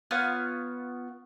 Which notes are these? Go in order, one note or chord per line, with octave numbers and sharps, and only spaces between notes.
B3 F4 C#5 F6